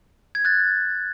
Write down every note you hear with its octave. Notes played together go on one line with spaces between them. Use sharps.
G#6
F#6 A6